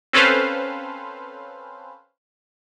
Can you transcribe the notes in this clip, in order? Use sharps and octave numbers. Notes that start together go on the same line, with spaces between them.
C4 C#4 A4 B4 C5 F5